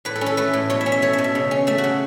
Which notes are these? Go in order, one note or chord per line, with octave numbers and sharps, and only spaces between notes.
A2 B4
A4
C#4
A4
A3 B4
A2
B2 C#5
E5
C#4
E5
A3 C#5
E5
B2
E5
C#3
C#4
A3 E5
F#4
C#3